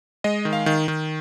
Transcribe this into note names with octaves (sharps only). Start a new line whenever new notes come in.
G#3 D#5
D#3
F5
D#3
D#3